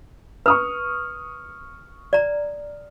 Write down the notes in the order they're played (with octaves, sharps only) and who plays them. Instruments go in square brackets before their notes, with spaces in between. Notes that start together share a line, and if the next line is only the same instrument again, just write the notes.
[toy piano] B4 [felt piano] C#6 D#6 F6
[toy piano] D5 A#5